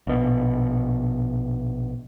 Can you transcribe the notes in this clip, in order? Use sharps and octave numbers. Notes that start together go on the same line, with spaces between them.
A#1 B2